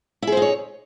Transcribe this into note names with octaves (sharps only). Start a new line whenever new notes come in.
D#4 E4 G#4 C5 C#5